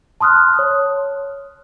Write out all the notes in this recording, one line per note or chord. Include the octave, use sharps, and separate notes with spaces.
A5 C6 D#6 F6 F#6
C#5